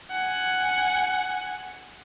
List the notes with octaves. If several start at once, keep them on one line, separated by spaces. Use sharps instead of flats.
F#5 G#5